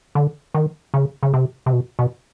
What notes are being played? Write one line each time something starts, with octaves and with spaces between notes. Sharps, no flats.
D3
D#3
C#3
C#3
C3
C3
B2
B2